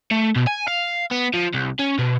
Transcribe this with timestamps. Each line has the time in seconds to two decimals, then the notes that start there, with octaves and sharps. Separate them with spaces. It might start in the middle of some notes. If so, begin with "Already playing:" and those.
0.11 A3
0.36 B2
0.47 G#5
0.68 F5
1.11 B3
1.34 F3
1.54 C2
1.79 C#4
1.99 B2